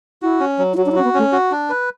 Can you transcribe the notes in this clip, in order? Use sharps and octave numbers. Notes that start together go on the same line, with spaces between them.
E4 F#4
C#4
F#3
E4
F#3 F#4
D4
E4
C#4 F#4
B3
A3 C#4
F#4
D4
B4